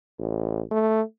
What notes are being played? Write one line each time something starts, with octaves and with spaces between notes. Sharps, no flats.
A1
A3